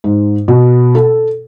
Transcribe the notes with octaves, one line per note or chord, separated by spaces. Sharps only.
G#2
B2
A4